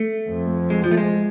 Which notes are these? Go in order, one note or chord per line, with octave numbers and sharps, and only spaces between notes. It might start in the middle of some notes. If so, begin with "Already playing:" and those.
Already playing: A3
F2
G#3
F3
A3
G#3